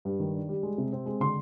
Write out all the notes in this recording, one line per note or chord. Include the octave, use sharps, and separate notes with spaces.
G2
D#3
D4
G3
G#3
C3
C4
G#3
D3 C6